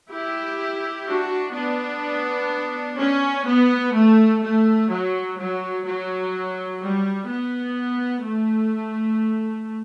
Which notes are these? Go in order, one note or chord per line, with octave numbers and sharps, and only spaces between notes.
E4 G4
D4 F#4
B3 D4
C#4
B3
A3
A3
F#3
F#3
F#3
G3
B3
A3